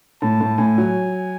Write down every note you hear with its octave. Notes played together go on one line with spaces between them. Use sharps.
A2 A5
A2
A2 G#5
F#3